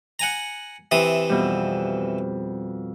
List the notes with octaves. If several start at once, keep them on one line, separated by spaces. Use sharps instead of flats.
F#5 G#5 A#5
C3 E3 D#6
F2 B2 G3